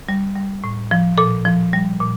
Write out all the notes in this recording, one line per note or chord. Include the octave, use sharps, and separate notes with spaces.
G3
G3
A2
F3
A#2 A4
F3
G3
A#2